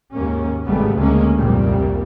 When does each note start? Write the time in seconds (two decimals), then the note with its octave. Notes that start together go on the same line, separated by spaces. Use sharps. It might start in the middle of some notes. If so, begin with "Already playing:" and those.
0.13 D#2 G#2 A#3 C#4
0.66 G#1 C#3 G3 A3 B3
0.96 D2 G#3 A#3 C#4
1.37 F1 C2 A#2 G3 A#3